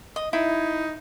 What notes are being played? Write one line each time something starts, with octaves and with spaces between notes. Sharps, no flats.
D#5
D#4 E4